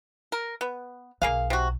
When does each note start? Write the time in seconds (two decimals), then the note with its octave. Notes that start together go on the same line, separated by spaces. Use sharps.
0.32 A#4
0.61 B3
1.22 B1 A#3 G#4 F5
1.50 C3 F#4